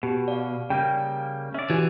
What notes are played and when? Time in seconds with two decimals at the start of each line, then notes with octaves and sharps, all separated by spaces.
0.03 B2 G4
0.28 D5 F5
0.70 C#3 G3 A#3 G5
1.54 C#4 D5 E5
1.70 E3 F#4 G4 G#5